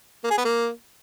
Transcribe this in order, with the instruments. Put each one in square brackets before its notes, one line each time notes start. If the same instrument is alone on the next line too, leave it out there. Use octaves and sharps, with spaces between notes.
[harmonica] A#3
G#4
B3
A#3